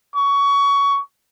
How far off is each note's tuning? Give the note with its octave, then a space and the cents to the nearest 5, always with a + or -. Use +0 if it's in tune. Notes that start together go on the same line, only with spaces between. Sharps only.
C#6 +20